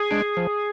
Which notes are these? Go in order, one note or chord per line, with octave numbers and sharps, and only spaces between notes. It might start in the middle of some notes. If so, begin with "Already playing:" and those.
Already playing: G#4
G#3 D4
F3